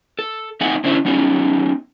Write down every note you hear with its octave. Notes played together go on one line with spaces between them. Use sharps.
A4
A3 C4 D#4 E5 F#5 G#5
D3 C#4 D4 E4 C5 E5
F#3 B3 C#4 D#4 G4